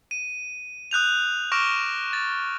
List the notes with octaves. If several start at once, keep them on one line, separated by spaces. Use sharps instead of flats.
D#7
D#6 F#6 G6 F7
C#6 D6 F6 A#6 D7 E7
A6